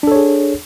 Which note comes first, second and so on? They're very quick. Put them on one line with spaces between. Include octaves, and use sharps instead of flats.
D4 A4 C#5 G#4